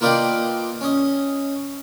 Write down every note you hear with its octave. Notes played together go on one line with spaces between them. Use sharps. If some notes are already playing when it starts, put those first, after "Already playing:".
A#3 F4 B4 D5 D#5 G5
C#4 D#5